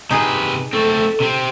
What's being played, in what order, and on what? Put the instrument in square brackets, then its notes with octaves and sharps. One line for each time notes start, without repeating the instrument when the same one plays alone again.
[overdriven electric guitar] C3 B4 [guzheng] D#4 G#4
[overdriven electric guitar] A3 C4 [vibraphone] A4
[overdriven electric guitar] C3 C4